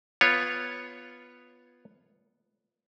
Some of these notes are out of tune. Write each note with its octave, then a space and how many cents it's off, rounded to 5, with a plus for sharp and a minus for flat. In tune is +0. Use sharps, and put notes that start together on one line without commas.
B3 +0 F4 +0 C#5 +0